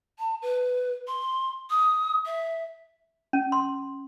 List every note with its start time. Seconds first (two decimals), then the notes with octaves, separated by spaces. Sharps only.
0.19 A5
0.42 B4
1.07 C6
1.70 D#6
2.25 E5
3.33 C#4
3.52 C6